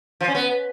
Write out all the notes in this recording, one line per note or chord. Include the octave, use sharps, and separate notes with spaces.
F3
C#4
B3